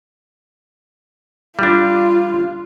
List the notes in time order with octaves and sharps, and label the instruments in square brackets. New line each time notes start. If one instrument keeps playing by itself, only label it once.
[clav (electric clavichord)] G3 D4 [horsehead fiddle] F4